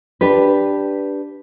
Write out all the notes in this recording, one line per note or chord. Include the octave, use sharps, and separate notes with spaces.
D4 G4 B4